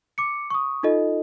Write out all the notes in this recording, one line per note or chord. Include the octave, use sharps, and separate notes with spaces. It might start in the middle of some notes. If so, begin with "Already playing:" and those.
D6 C#7
C#6 D#6
D#4 F4 A4 D#5